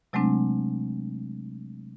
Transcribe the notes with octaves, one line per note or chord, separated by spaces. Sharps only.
C3 F#3 G#3 A3 C4 D4